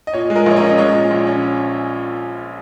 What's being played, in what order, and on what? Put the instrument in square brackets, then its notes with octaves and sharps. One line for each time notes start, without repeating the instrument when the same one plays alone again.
[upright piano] D#5
A#2 C#5
G#3
A#4 D#5
A#1 C#5
A#4 D#5
C#4
D#5
G#3 C#5
A#2
A#1
C#4